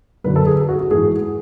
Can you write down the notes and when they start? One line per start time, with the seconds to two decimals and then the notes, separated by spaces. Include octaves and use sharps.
0.24 F#2 D3 F#3 B4
0.36 A4
0.47 G#4
0.69 F#4
0.80 F#4
0.91 G#2 E3 G#4